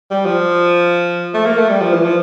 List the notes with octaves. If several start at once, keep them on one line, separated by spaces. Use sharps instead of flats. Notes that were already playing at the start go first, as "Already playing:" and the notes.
G3
F3
A3
A#3
A3
G3
F3
E3
F3